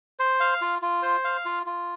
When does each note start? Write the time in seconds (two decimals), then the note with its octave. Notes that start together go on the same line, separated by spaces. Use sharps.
0.19 C5
0.40 F5
0.61 F4
0.82 F4
1.02 C5
1.25 F5
1.45 F4
1.66 F4